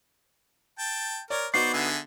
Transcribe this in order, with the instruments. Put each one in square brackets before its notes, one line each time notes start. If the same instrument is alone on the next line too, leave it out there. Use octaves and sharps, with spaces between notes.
[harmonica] G5 A5
[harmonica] A#4 [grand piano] C#5 D5
[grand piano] B3 D#4 F#4 [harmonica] C5 D5 C#6 [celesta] C7
[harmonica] D3 G#4 E5